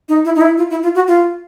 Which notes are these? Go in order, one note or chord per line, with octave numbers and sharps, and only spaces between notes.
D#4
E4
D#4
E4
F4
E4
F4
F#4
F4